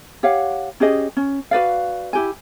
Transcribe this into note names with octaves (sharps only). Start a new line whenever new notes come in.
G4 C#5 F5 F#5
C#4 G4 G#4 D#5
C#4
F#4 B4 D5 F5
E4 G4 G#5